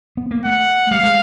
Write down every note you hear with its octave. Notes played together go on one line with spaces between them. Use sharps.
B3
A#3
A3 F#5
G3 F5
G#3